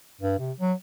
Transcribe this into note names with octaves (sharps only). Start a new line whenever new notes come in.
G2
C3
F#3